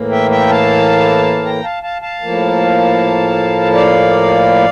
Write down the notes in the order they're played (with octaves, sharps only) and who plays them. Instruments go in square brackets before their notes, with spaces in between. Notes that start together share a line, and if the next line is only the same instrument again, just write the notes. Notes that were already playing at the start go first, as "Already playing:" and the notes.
Already playing: [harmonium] A2 E3 A#3
E5 G5
E5 G5
F5 A5
G5 A#5
F5 A5
F5 A5
F5 A5
A2 F3 A#3
D5 F5